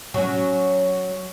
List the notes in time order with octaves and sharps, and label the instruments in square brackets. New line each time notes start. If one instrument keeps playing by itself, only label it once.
[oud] F#3 C#4